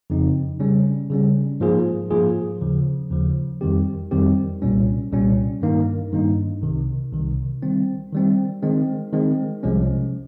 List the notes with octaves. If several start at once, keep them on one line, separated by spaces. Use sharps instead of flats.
F2 C#3 F3 C4 D#4
C#3 G3 C#4
C#3 G3 C#4
G#2 F3 A#3 F4 G#4
G#2 F3 A#3 F4 G#4
D#2 C#3 F3
D#2 C#3 F3
F2 D#3 G3 C4 G4
F2 D#3 G3 C4 G4
C2 A#2 G3 C#4
C2 A#2 G3 C#4
G2 D#3 A#3 D#4
G2 D#3 A#3 D#4
C2 C3 D#3
C2 C3 D#3
D#3 G3 C4
D#3 G3 C4
D#3 G#3 C4
D#3 G#3 C4
C2 C3 F3 G#3 C#4